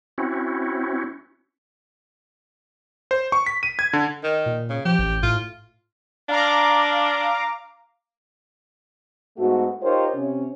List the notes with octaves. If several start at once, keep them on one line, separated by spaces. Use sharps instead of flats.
C4 C#4 E4 F#4
C5
C#6
B6
D#7
G#6
D3
D#3
A#2
C#3
F3 G4
A1
A2 F4
D4 F5 A#5 D6
G#2 A3 B3 F#4
D#4 F4 G4 A#4 C5 C#5
C3 C#4